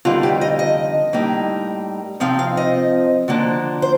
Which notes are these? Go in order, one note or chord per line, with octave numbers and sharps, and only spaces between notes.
F2 D3 G3 A#3 D#4 F4
G4
D#5
D#5
A2 G3 A#3 D#4
C3 F3 C4 D#4 F5
F5
D#5
D3 F3 A#3 D4
C5